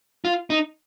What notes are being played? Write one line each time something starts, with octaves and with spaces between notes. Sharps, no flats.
F4
D#4